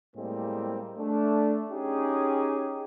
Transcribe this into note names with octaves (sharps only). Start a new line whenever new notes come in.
A2 G3 G#3 A#3 C4
A3 D4
C#4 D#4 G4 G#4